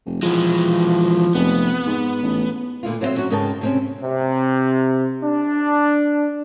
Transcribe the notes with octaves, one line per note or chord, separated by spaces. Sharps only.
F1
E3 F3 G#3
F1 B3
G#2
A1
A#2 D3 E4 F4
F#3 C4 E4 F#4 C5 E5
F#3 C#4 F#4
G#2 C#3 A#4 G5 A5
C3 C4 C#4
C3
D4